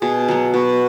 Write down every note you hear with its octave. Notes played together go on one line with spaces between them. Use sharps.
B2 G#4
F#3 B3
B2 F#4 B4